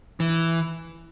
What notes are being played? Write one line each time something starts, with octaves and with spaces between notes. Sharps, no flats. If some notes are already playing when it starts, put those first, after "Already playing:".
E3